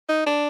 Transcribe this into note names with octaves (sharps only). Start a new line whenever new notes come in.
D#4
D4